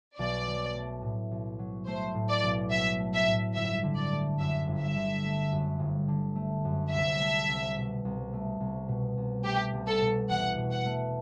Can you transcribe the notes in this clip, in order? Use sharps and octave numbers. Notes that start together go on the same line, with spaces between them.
B1 D5
F#3
A3
A2
B1
F#3
A3 C5
A2
D5
B1
F#3 E5
A3
E5
A2
G1 E5
D3
D5
A3
F#2 E5
G1
E5
D3
A3
F#2
G1
D3
A3
F#2
C2 E5
A3
C2
B2
C2
A3
C2
B2
C2
A3 G4
C2
A4
B2
E1 F#5
B2
F#5
A3